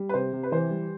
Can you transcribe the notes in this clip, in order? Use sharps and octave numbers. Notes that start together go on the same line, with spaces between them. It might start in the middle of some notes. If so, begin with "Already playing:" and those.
Already playing: G3
B4
C3 C5
C3
B4
E3 C5
G3